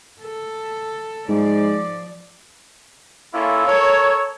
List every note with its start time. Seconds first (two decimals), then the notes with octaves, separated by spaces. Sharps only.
0.21 A4
1.29 G#2 F3 D5
3.33 A#3 C#4 E4 F4 A4
3.67 A4 A#4 C#5